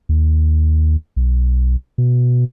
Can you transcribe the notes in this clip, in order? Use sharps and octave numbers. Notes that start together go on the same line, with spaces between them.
D#2
B1
B2